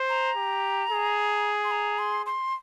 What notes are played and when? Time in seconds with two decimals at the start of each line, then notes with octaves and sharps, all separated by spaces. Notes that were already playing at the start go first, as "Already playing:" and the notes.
Already playing: C5
0.09 A#5
0.36 G4
0.91 G#4
1.64 C6
1.71 A#5
1.99 C6
2.26 C6